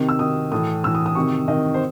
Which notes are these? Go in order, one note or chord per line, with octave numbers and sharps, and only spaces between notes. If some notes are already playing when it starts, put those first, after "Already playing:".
Already playing: C3 D#3
E6
C3 D#3 D#6
A2 E3 D#6
A2 E3 E6
D#6
D#6
C3 D#3 C#6
C3 D#3 D#5
C5